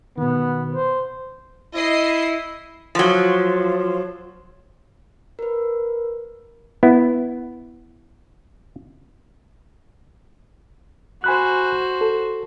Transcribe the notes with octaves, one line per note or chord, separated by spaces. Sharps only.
B2 D#3 B3
C5
E4 D#5 C7
F3 F#3
A#4 B4
B3 E4
F#4 C5 G#5 B5 F#6
A4